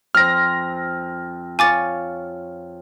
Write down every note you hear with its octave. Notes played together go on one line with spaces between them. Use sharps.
F2 C5 F6 A#6
F4 C#5 G#5 D6 A6